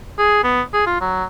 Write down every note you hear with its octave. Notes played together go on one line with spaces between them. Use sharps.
G#4
B3
G#4
F4
F#3